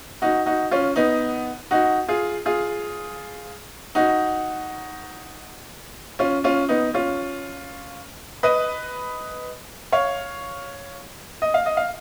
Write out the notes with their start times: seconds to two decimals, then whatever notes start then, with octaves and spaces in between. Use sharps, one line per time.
0.22 D#4 F#4
0.46 D#4 F#4
0.71 C#4 F4
0.96 B3 D#4
1.71 D#4 F#4
2.09 F4 G#4
2.46 F4 G#4
3.95 D#4 F#4
6.19 C#4 F4
6.44 C#4 F4
6.69 B3 D#4
6.94 C#4 F4
8.43 B4 D#5
9.92 C#5 F5
11.42 D#5
11.54 F5
11.66 D#5
11.77 F5